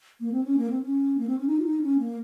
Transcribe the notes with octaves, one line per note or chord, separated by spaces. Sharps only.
A#3
C4
C#4
A#3
C4
C#4
A#3
C4
C#4
D#4
F4
D#4
C#4
A#3